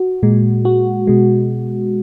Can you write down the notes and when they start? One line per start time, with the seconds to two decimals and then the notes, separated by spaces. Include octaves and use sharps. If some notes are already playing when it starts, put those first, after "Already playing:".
Already playing: F#4
0.23 A#2 G#3
0.65 F#4
1.07 B2 G#3